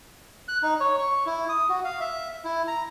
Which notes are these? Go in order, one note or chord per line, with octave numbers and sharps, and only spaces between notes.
F#6
D#4
C#5
C#6
E4
D#6
F#4
F5
E5
E4
A#5